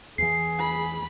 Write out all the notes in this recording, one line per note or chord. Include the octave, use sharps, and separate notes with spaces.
E2 E3 G#4 C7
B5